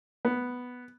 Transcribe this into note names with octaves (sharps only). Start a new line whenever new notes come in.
B3